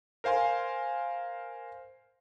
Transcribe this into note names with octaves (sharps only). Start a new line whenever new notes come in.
A#4 C5 F5 G#5 C6